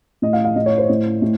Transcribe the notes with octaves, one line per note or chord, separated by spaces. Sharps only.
A2 D#5
F5
F5
A2 D#5
C#5
C5
A2
A2